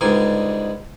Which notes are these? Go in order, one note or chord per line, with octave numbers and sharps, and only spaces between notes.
C#2 G#2 D3 G3 G#5